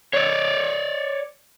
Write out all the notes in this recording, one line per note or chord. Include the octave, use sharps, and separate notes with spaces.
C#5 D5